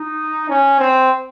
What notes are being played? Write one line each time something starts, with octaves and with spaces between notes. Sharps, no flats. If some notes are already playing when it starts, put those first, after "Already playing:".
Already playing: D#4
C#4
C4